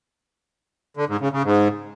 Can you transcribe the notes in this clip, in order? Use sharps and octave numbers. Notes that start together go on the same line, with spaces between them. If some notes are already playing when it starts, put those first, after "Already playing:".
D3
G#2
C#3
C#3
G#2